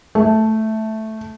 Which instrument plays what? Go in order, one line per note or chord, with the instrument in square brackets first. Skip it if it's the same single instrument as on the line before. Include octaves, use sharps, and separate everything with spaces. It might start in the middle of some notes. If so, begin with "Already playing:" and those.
[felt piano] A3